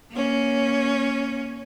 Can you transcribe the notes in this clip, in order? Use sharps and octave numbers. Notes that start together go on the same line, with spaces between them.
A#3 C#4